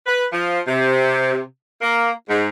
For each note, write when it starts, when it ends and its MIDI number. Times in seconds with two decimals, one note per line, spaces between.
0.06 0.24 71
0.32 0.59 53
0.67 1.41 48
1.80 2.10 58
2.28 2.48 44